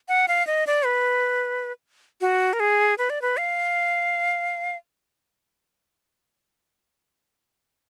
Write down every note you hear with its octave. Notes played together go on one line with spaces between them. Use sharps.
F#5
F5
D#5
D5
B4
F#4
A#4
G#4
B4
D5
B4
F5